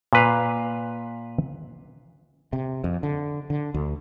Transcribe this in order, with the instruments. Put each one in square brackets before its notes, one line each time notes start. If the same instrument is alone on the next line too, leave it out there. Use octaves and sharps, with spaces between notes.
[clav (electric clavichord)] A#2 B4 F5
[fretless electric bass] C3
F2
D3
D3
D2